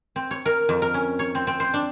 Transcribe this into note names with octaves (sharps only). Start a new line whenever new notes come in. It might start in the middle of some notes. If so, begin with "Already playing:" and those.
C4
C#5
A#4
F2
A#4
C#4
C#5
C4
C4
C5
D4